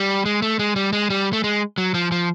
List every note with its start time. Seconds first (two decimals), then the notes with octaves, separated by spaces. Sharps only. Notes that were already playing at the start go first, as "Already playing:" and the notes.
Already playing: G3
0.26 G#3
0.42 A3
0.59 G#3
0.76 G3
0.93 G#3
1.10 G3
1.33 A3
1.44 G#3
1.78 F#3
1.94 F3
2.12 F3